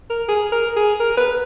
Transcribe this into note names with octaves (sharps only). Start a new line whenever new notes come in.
A#4
G#4
A#4
G#4
A#4
B4